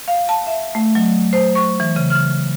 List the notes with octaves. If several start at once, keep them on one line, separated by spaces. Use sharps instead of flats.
F5
A5
E5
A3
F#3
C5
C#6
E3
C#3
F6